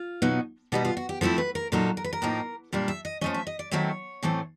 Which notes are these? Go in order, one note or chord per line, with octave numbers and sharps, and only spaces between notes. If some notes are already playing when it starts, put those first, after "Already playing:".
Already playing: F4
B2 F#3 B3 D#4
B2 G3 B3 D#4 F4
F4
F#4
G4
F3 A3 C4 E4 A4
B4
A#4
A#2 F#3 A#3 D#4 A4
A#4
B4
A#4
A2 F3 A#3 D#4
A#2 G3 A#3 D4
E5
D#5
F3 A3 C#4 D#5
E5
D#5
D5
D#3 F#3 A3 C4 E4 C#5
A2 E3 A3 C4